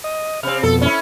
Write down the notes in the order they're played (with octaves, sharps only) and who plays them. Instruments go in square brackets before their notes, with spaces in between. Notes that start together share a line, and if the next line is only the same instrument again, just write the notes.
[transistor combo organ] D#5
[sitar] C3 C4 [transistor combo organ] F6
[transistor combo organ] F2 B2 [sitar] A4
[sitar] C#4 E4